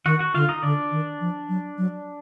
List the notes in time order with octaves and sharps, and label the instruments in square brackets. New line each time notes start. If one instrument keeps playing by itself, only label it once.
[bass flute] D#3 [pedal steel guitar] F#4 F#5
[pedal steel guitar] F#4 F#5
[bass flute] D3 [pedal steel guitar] F4 F5
[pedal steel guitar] D#4 D#5
[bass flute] D3 [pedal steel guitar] D4 D5
[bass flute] D#3
F3
F#3
F#3